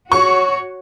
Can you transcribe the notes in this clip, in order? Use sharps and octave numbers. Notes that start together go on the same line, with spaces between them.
F#4 C#5 C#6